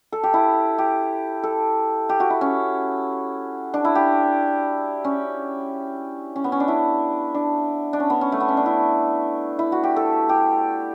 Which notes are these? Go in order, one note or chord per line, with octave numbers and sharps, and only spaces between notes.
A4
G4
E4
G4
A4
G4
F#4
E4
C#4
D4
E4
G4
C#4
C#4
B3
C#4
D4
E4
D4
D4
C#4
B3
C#4
A3
B3
C#4
D4
E4
E4
F#4
G4
A4
G4